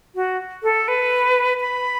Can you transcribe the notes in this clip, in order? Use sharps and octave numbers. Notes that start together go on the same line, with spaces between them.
F#4
A4
B4
B5